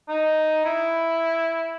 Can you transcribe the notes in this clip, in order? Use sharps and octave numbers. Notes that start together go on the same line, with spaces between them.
D#4
E4